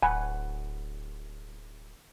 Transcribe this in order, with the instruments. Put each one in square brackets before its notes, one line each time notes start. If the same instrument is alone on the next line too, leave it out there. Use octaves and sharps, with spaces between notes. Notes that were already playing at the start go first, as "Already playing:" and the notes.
[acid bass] D1 [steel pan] F#5 [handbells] G#5 B5